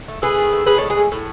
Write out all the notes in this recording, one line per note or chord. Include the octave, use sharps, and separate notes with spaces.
A3
A3 G#4 B4
D#3
A3
A2 G#4 B4
G#3 A4 C#5
G#4 B4
A2
A2